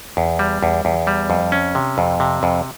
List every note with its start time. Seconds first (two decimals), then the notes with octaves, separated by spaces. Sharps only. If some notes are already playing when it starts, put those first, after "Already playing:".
0.17 E2
0.39 G3
0.63 E2
0.85 E2
1.07 G3
1.30 F2
1.52 C#4
1.75 C3
1.98 F2
2.20 C3
2.43 F2